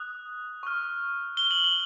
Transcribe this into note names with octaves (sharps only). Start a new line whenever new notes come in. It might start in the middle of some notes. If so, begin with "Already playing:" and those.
Already playing: D#6 F#6
C#6 F6
G7
F#7
G7